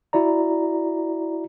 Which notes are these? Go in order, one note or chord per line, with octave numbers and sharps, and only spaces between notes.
E4 F#4 D5 A#5